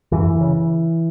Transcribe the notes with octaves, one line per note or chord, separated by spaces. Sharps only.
F#2 E3
C#3